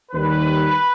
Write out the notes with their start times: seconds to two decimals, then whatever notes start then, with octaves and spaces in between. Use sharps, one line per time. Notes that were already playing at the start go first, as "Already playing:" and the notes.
0.12 D#2 D#3 G3 B4